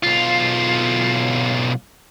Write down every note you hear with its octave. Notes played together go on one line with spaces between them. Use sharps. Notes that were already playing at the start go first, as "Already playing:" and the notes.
B1 F4